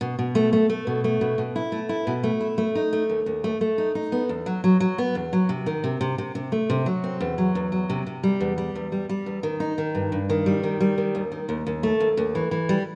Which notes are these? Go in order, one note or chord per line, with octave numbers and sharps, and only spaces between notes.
B2
B2
A3
A3
A3
B2
A3
B2
B2
E4
A3
E4
B2
A3
E4
A3
D#4
A3
D#2
D#2
A3
A3
D#4
D#4
B3
E2
F#3
F#3
F#3
B3
E2
F#3
C3
D#3
C3
C3
C3
C3
A3
C3
F#3
C4
E2
F#3
E2
F#3
C3
C3
G3
E2
G3
E2
G3
G3
E2
D#3
D#4
D#3
G2
G2
D#3
G3
D#3
G3
D#3
D#2
D#3
D#2
D#2
A3
D#2
D#2
E3
E3
G3